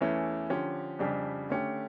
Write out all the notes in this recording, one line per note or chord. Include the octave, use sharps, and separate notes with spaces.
E2 E3 A3 C#4 E4
D3 F3 C#4 G4
F2 C#3 G3 D4 G4
D3 A3 C#4 G4